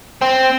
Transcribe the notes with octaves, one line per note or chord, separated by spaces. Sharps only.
C4